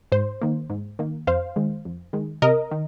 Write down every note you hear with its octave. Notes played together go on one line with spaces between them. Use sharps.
G#2 C5
D#3 A#3
G#2
D#3 A#3
F2 C5 F5
D#3 G#3
F2
D#3 G#3
C3 A#4 D#5
D#3